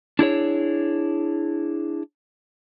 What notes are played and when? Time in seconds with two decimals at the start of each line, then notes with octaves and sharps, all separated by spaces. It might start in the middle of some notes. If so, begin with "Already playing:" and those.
0.19 D4 E4 G#4 C#5